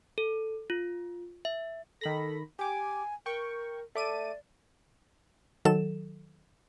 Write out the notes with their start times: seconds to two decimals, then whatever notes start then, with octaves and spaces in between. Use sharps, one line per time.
0.18 A4
0.70 F4
1.45 E5
2.01 D#3 A4 B5 A#6
2.59 G4 G#5 D6
3.26 A#4 G5 C#6
3.95 A3 D5 D6 D#7
5.65 D#3 F#3 A4 E7